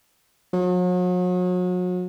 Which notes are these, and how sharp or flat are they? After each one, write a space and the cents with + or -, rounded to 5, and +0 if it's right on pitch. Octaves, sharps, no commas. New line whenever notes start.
F#3 -40